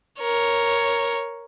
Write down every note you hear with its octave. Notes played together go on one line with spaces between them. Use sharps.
A#4 C#5